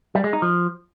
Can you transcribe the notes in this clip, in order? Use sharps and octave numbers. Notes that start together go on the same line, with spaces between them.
G3
G#3
D#4
F3